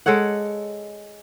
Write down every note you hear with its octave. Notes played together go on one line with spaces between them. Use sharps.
G#3 A4 C#5 F#5